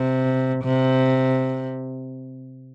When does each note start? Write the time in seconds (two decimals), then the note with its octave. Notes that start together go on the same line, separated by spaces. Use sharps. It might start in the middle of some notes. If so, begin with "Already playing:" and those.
Already playing: C3
0.64 C3